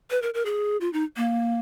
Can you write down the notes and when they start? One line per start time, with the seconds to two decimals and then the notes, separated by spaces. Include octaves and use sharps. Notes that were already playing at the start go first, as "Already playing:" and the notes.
0.11 B4
0.22 A#4
0.34 A#4
0.45 G#4
0.81 F4
0.93 D#4
1.17 A#3